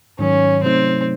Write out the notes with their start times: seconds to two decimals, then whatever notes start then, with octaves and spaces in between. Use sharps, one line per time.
0.19 G#2 D#3 F#3 C#4
0.63 C3 F#3 A3 C4 D#4